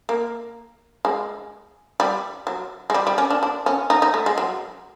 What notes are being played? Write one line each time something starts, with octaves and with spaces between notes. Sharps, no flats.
A#3
G#3
G3
F#3
G#3
G3
G3
C#4
D4
D4
C#4
D#4
D#4
A3
G#3
F#3